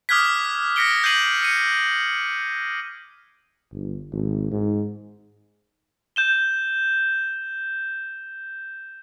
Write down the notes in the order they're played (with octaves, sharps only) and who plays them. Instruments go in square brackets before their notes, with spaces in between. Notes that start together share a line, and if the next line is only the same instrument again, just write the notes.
[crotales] D6 D#6 F6 F#6 G#6 B6
F#6 A#6 B6 C#7 D7 G7
G6 G#6 C7 D#7 F#7
E6 C#7 D#7
[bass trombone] G1
G#1
G#2
[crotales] G6 E7 G7